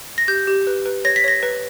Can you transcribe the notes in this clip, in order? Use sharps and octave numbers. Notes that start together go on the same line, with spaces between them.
A#6
G4 G6
G4
B4
B4
C#5 A#6
B6
C#5 A#6
B4